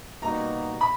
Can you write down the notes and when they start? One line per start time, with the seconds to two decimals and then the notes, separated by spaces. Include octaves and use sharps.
0.22 B2 G3 A#3 D#4 F#4 A#5
0.81 B5